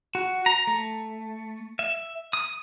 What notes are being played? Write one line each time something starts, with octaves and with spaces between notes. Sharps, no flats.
F#4
A#5
A3
E5
D#6